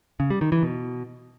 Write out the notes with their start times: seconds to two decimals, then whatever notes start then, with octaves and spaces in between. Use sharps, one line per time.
0.20 C#3
0.30 G3
0.41 D#3
0.52 E3
0.63 B2